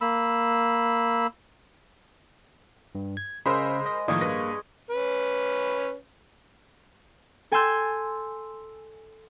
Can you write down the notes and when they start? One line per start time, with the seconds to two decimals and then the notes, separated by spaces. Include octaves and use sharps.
0.01 A#3 B5 E6
2.95 G2
3.17 G#6
3.46 C#3 G#3 A#4 C5 B5 E6
3.86 D#5
4.08 A2 D#3 F3 A#3 D#5 G#5 C#6
4.21 G2 B4 A#6
4.91 C#4 B4
7.51 A4 G#5 A5 C6 E6 G6